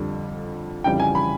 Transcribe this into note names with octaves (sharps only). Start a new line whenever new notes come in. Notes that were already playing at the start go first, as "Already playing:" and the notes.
Already playing: F2 D3 G3
F2 C#3 E3 G3 G5
G#5
B5